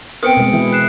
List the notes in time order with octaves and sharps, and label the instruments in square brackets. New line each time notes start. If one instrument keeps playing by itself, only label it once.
[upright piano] B3 C4 [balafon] A#4 G5 [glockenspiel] D#6 C#7 D7
[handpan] B2 G#3
E3 E4
[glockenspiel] F#6 C7 E7